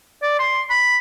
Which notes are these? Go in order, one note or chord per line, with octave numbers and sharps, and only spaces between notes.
D5
C6
B5